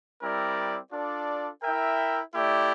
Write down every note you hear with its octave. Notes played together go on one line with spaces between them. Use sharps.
G3 C4 E4 A#4 D5
D4 F4 A4 D5
E4 A#4 E5 G5
A3 E4 G4 D5